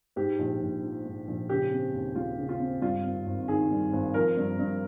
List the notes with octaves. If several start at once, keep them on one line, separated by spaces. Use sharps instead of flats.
G#2 G4
A#1
A#1
F3
G#2
A#1
C#3 G4
C4
D#2
G#3 F4
C#3
F4
C4
G2 F4
G#1
G#1
D#3 G#4
G2
G#1
F3 A#4
G2
G2